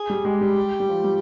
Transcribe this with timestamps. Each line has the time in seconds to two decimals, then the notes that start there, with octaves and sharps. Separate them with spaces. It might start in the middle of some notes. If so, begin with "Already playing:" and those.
Already playing: G#4
0.10 G3
0.25 G#3 G4
0.41 G3
0.80 G3
0.89 F3
1.04 G3